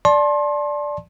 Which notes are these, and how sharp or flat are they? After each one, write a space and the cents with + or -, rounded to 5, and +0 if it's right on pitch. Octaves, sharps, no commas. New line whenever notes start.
D5 +0 A5 -20 C6 +30